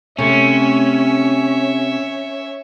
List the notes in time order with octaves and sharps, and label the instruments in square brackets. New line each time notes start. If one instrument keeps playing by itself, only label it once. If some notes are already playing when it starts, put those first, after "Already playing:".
[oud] C3 A3 [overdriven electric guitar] C#4 [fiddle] C#5 E5